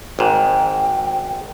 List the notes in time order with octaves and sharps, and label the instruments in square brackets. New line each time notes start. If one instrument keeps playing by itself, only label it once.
[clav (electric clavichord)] G#1 G#2 [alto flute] G5